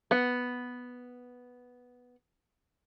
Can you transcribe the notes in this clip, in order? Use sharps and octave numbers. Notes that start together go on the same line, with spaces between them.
B3 F#5